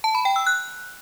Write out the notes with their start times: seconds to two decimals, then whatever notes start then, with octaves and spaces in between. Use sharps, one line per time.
0.04 A5
0.15 B5
0.25 G5
0.36 E6
0.47 F#6